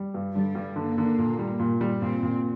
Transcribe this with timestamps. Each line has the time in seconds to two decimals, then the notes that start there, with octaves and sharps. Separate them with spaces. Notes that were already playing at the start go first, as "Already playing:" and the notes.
Already playing: G3
0.14 G2
0.34 D3 G3
0.55 G2
0.76 D3 A#3
0.98 D3
1.18 A#2
1.39 G3
1.59 A#2
1.81 G3
2.02 A#2 C4
2.23 A#2